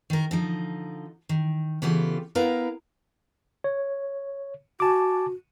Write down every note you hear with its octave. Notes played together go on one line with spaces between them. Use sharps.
D#3 A#4
D3 F3 D#4
D#3
C#3 E3 B3 F4 G4 A4
B3 E4 A#4 B4 F5 A#5
C#5
F#4 G#5 A5 D6